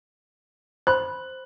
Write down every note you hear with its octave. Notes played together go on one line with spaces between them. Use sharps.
C5 B5 C6 F#6